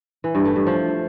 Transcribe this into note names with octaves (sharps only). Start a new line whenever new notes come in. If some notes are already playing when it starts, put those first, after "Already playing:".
E3
G2
A3
G2
F3